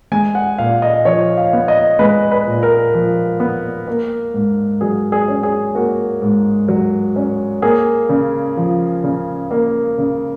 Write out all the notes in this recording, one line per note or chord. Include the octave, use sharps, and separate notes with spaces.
G#3 G#5
F#5
A#2 F5
D#5
F3 C#5
F5
B3
D#5
G#3 B4
B4
A#2
A#4
F3
B3
A#3
G#2
F#3 G#4
G#4
C#4
G#4
A#3 F#4
G#2
F#3
C#4
A#3 G#4
C#3
F3
C#3
A#3
C#3